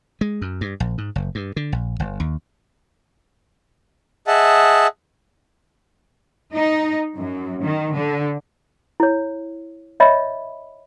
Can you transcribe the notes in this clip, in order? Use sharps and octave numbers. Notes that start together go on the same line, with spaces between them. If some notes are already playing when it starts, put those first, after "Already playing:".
G#3
F#2
G2
A#1
G#2
F#1
G2
D3
A#1
G1
D#2
G#4 D#5 E5 F#5 A5
D#4
F#2
D#3
D3
E4 C#5
C#5 D#5 E5 B5